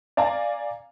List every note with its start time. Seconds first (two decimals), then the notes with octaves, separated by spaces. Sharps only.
0.17 D5 F5 G#5 A#5